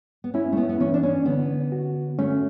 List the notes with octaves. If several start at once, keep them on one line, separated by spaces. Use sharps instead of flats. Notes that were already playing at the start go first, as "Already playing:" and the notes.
B3
C#4 E4
A3
B3
B3
E3 C#4
D4
C#4
D3 B3
F#4
A3 C#4